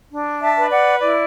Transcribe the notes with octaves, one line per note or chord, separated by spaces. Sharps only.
D4
E5 A5
B4
D5 F#5
E4 D5